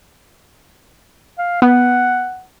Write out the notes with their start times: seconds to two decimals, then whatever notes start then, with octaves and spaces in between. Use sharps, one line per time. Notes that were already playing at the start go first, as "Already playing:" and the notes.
1.38 F5
1.62 B3 F#5